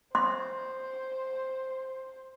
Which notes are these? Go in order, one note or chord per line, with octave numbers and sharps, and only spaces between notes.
C5 C6